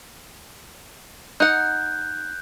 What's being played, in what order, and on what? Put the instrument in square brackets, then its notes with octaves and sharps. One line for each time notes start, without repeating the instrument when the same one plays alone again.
[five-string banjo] D#4 F#5 [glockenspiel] F#6 G6